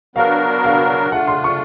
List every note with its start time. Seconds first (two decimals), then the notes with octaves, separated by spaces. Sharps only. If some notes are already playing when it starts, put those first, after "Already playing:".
0.16 F#3 B3 D4 F#4 A#4 F5
0.64 F5
1.12 A3 D4 F4 F#5
1.27 C6
1.44 C#6